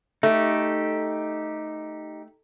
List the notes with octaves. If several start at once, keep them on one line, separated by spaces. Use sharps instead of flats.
A3 D#4 G4